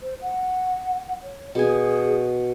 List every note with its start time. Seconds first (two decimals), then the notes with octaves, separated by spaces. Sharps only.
0.01 C5
0.22 F#5
1.23 C#5
1.55 B2 G#4 G#5